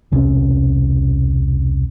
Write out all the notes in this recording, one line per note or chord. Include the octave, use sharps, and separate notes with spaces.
E1 C2 C3 C#4